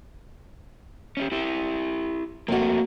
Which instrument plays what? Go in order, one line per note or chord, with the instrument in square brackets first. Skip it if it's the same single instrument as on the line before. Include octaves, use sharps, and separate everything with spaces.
[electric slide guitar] C#4 D#4 G4
E4 G4
[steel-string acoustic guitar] F2 F#4 [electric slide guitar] A3 A#3